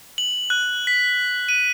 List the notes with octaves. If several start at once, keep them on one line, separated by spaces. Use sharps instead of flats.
F#7
F#6
B6
D#7